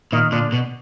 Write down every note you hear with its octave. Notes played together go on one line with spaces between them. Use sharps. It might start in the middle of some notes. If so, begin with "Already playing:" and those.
A#2 D#3 D#4
A#2 D3 D4
B2